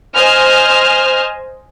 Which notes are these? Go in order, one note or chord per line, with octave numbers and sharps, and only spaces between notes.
C5 D#5 G#5 F6